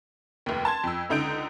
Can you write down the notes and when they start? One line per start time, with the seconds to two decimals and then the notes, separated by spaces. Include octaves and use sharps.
0.46 F1 D#2
0.65 A5 C6 G#6
0.84 F2 E6
1.09 C#2 D3 D#4 G6 D7